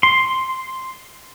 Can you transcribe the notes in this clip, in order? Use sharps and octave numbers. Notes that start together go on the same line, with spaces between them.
C6